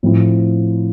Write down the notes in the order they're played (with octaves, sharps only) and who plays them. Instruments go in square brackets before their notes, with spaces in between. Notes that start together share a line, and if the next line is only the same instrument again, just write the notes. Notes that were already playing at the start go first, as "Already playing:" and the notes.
[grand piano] A2 F3 C4 E4